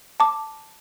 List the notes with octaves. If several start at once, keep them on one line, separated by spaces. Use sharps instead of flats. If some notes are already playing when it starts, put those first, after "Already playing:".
A5 D6